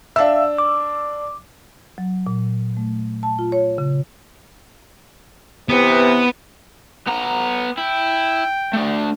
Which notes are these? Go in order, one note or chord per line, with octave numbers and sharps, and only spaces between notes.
D4 E5 F5 E6
D6
F#3
A#2
A3
A5
F4
C#5
C#3
C3 E3 B3
B3 A#5
E4 G5
A3 D4